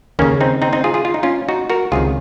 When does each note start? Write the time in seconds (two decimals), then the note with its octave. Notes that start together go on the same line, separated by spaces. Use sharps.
0.19 D#2 C#3 A#3 C#4
0.41 C4 D#4
0.62 C4 D#4
0.73 C4 D#4
0.84 F4 G#4
0.94 F4 G#4
1.05 F4
1.14 D#4
1.23 C#4 F4
1.48 D#4 F#4
1.70 F#4 A#4
1.92 C#2 C3 D#3 F4 G#4